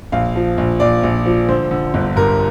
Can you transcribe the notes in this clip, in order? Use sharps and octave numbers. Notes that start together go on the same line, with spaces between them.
A#1 F5
F3
A#1
A#1 D5
A#1
F3
D3 C5
D3
G1
G2 A#4